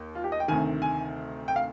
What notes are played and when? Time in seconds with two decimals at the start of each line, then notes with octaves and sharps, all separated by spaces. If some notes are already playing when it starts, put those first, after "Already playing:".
Already playing: D#2
0.15 F4
0.24 G4
0.32 D#5
0.40 G5
0.48 D2 C3 D#3 G#5
0.82 G#5
1.48 G5
1.56 F5